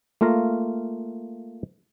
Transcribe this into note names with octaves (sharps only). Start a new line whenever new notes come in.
A3 A#3 F4 F5 A#5